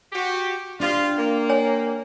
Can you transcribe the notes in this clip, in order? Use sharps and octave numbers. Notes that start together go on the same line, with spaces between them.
F#4 G4
D4 F4 G4
A#3
C#5 G#5